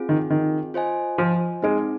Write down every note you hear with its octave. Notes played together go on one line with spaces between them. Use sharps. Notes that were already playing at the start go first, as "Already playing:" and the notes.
Already playing: C4 F4 G#4
D#3
D#3
F4 C5 D#5 G#5
F3
G#3 C4 D#4 G#4